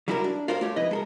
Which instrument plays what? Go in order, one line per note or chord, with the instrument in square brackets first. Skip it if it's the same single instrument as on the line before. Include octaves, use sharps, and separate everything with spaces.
[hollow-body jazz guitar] F#3 G3 E4 F#4 G4 A#4
D4
F4 F#4 A#4 C5 C#5 F5
A3 G4 C#5
F2 E4 B4 D#5
G#3 A4 A#4